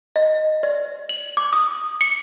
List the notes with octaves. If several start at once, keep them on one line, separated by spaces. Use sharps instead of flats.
D#5
D5
F#7
D6
D#6
C#7